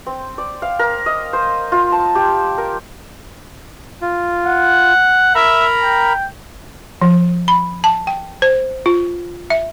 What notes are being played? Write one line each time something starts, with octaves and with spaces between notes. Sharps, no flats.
C4
D5
F5
A#4
D#5
C5
F4
A5
G4
A#4
F4
F#5
A#4 E5 A#5 B5
G5
F3
B5
A5
G5
C5
F4
E5